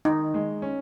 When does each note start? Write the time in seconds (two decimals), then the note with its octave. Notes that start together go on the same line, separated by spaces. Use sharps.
0.05 D#3 D#4
0.34 G#3
0.62 C#4